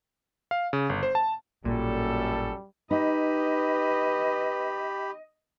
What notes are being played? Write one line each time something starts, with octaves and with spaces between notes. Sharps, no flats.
F5
C#3
G1
C5
A5
A1 F#2 A#2 G3 A#3 A4
D#4 G4 B4 D#5 B5